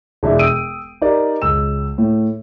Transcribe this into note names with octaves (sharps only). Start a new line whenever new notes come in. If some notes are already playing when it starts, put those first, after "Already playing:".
E1 E3 D4 E4 E5
G5 D#6 E6 D7 D#7
D#4 G4 A#4 D5 D#5
C#2 E6 E7
A2